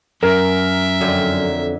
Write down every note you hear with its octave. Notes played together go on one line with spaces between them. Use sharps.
F#2 A#4 E5
F2 D3 F#3